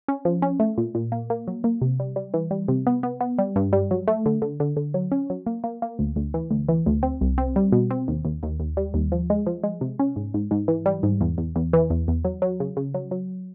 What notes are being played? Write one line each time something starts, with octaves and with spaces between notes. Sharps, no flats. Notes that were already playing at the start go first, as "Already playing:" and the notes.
C#4
F3
C#4
A3
A#2
A#2
A#3
A#3
F#3
A#3
C3
G3
G3
E3
G3
C3
B3
B3
B3
G3
G2
G3
F#3
A3
D3
D3
D3
D3
F#3
C#4
F#3
A#3
A#3
A#3
D2
D2
E3
D2
E3
D2
C4
C2
C4
G3
B2
C4
D#2
D#2
D#2
D#2
G3
D#2
F3
G#3
F3
G#3
C3
C#4
G#2
G#2
G#2
E3
G3
G#2
E2
E2
E2
E3
E2
E2
F#3
F#3
C#3
C#3
F#3
F#3